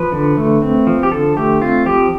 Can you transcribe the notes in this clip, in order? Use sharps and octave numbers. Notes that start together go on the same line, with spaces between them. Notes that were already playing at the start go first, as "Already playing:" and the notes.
Already playing: F3 B4
D3
A3
C4
F3
G4
D3 A4
A3 G4
C4 F4
F3 G4